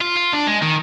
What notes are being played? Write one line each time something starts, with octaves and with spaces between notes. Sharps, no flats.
F4
F4
D4
G#3
D#3